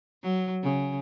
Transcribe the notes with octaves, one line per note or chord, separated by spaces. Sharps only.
F#3
C#3